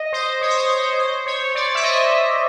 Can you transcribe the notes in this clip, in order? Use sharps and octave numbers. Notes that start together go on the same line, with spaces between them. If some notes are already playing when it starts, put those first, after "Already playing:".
Already playing: D#5
C5
C#5
C5
C#5
C5
C5
C#5
D5
E5
D#5